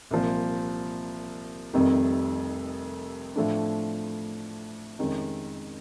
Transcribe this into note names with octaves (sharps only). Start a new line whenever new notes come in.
C2 A#2 F3
F1 F2 C3 D#3 G3
A2 F3 A3 D4
F2 C3 D#3 G#3 C#4